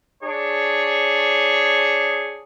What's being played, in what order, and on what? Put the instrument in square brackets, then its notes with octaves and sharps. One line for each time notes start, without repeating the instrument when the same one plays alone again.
[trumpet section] D4 G#4 C#5